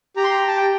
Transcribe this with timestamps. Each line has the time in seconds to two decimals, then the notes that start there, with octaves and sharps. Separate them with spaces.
0.16 G4 A#5
0.24 C6
0.31 A#5
0.48 A5
0.57 G5